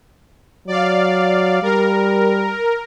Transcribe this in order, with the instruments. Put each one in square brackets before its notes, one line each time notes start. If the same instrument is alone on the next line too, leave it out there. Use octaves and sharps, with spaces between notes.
[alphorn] F#3 [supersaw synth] D5 F5
[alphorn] G3 [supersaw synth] A#4